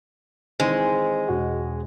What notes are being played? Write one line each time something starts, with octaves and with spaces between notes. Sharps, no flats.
D#3 E3 G#3 C4
E1 F#4 D#5